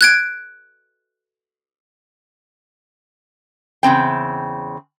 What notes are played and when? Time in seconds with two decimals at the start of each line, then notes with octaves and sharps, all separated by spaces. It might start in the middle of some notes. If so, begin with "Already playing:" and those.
0.01 F#6 G#6 D7
3.83 E2 C#3 C4 G5